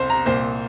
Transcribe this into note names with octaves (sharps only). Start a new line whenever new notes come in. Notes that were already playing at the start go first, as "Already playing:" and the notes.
Already playing: C2 C3 C5
A#5
C2 A#2 C5